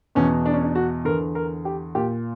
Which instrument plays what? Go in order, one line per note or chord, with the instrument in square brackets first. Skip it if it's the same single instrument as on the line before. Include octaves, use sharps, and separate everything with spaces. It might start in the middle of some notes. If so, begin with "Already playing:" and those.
[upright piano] E2 B2 C#4
D4
C#4
D4
F#4
E2 D3 A#4
A#4
G4
A#2 G4